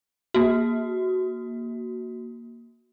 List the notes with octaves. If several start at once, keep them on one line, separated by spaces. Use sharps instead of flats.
A#3 F#4